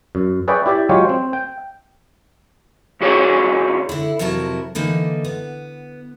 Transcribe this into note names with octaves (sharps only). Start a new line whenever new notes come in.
F#2
G#4 B4 C#5 D5 E5 G5
E4 G4 D5 E5
F#3 G#3 F4 G4 C#5
C4 C5
G5
D#2 A#2 F#4 G#4 C#5 D5
D3 E4
F2 C3 F#3 E4 A#4 A5
D3 E3 A#3 D#4
B3